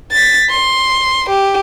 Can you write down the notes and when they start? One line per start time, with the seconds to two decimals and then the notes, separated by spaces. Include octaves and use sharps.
0.12 A6 B6
0.50 C6
1.29 G4